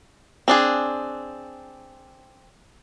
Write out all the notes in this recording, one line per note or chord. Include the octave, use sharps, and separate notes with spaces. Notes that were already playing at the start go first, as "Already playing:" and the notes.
C4 D4 G#4